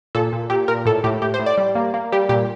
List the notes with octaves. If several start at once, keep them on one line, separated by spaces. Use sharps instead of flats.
A#2 A4
A#2
A#2 G4
A#2 A#4
A2 A4
A2 G4
A2 G4
C5
A2
D5
G3
A#3
A#3
G3 G4
A#2 G4